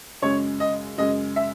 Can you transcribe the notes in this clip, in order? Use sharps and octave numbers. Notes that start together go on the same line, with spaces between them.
F#2 C#3 G#3 C#5
D#5
F#2 C#3 G#3 D#5
E5